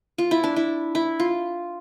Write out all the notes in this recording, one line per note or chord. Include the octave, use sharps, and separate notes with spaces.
F4
E4
D4
E4
E4
F4